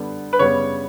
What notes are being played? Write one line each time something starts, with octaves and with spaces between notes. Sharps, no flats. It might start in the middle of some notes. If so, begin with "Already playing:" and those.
Already playing: D3 G3 B3
B4
C#3 G3 B3 C#5